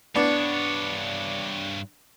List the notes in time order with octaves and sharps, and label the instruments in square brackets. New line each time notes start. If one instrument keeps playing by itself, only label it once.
[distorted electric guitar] G2 C#5 [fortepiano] B3 D4